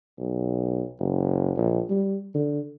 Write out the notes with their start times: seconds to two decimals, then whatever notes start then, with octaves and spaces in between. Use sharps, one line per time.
0.19 B1
1.00 F#1
1.57 A#1
1.90 G3
2.35 D3